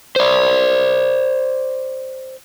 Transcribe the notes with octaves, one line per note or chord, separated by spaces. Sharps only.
C5 D5